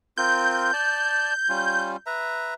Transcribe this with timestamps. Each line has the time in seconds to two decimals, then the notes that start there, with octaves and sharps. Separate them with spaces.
0.18 C4 F4 A#4 G6
0.73 D5 A5
1.49 G3 C#4 F4
2.06 B4 E5 A#5